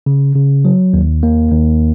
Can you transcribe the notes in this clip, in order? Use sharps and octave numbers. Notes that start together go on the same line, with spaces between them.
C#3
C#3
F#3
D#2
A#3
D#2